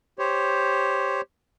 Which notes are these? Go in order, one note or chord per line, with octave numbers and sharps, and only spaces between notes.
G4 C5 C#5